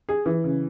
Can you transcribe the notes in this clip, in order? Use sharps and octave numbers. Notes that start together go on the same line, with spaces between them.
G#4
E3
C#3